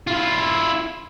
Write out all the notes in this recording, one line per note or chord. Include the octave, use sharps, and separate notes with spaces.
E4 F4